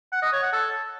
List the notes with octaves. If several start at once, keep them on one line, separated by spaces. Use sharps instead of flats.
F#5
D#5
C#5
F#5
A4